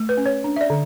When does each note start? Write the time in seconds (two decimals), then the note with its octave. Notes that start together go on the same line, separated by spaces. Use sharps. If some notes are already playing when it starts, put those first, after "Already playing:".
Already playing: A3
0.09 B4
0.17 C#4
0.26 C#5
0.44 D4
0.56 E5
0.61 D5
0.70 D3